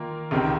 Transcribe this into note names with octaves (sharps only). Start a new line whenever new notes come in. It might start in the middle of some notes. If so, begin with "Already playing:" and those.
Already playing: D#3 A#3 F4
C#2 C3 D#3